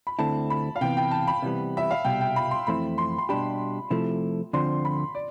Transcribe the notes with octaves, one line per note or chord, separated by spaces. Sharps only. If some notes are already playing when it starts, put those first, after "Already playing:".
B5
D2 D3 A3 C4 E4 A5
B5
F5
C3 E3 B3 G5
G5
A5
B5
C3 E3 G3 B3
E5
F5
C2 B2 G3 G5
G5
B5
C6
F2 E3 A3 C4 E4 B5
C6
C6
B2 G3 D4 G4 B5
C3 F3 A3 E4
D2 D3 F3 C4 C6
B5
D5